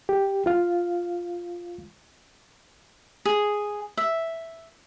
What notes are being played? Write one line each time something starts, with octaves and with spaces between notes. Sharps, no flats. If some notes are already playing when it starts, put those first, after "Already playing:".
G4
F4 F5
G#4
E5